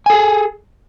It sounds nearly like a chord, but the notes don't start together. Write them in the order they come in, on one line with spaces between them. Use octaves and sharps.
G#5 A4 G#4